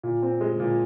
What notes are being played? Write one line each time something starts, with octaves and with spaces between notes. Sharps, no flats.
A#2
C4
G#3
A#2